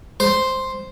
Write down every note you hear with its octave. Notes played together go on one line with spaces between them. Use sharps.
C5